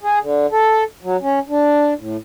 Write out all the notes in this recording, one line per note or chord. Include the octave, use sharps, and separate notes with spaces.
G#4
D3
A4
F#3
C#4
D4
A2